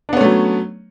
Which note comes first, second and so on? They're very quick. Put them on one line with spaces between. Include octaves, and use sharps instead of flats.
D4 B3 C#4 A3 F#3